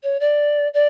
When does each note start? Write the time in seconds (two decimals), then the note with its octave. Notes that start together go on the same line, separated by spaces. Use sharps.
0.03 C#5
0.20 D5
0.73 D5